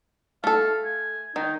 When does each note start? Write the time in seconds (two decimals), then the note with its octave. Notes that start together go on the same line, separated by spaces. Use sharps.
0.44 A3 A4 F5
0.84 G#5
1.36 D#3 D#4